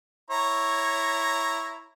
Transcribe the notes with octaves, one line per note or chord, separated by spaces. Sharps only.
E4 C#5 A#5